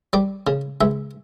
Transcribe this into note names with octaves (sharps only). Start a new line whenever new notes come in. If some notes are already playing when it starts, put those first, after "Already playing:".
G3 D5
C#3
C#2 E5